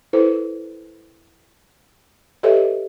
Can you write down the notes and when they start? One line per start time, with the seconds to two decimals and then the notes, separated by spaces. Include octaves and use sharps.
0.13 E4 A4 B4 C5
2.43 G4 A4 B4 C#5 D#5 E5